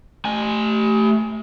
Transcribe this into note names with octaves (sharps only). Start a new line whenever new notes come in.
A3 G#5